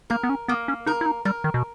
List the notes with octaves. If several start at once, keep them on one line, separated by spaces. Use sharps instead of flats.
A#3 A#4
B3
C#4
A#3 B3
C#4
D#4 A#4
E4
D#4
G3 A#4
D#3
B2